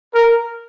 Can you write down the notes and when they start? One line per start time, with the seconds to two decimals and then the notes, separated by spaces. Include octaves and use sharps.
0.14 A#4